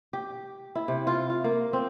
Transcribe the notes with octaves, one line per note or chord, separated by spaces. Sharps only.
G4
E4
C3
F4
F4
A#3
C4